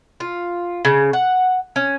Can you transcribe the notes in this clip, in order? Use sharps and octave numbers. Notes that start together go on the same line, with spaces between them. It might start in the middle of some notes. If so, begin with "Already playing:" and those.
F4
C#3
F#5
C#4